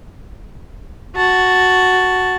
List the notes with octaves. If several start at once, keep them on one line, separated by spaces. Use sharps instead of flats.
F#4 A5